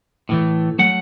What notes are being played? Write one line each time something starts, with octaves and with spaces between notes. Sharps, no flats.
A2 E3 A3
F#3 A3 F#5